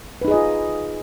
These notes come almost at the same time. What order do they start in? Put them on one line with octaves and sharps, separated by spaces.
B4 D#4 G#4 D#5 F4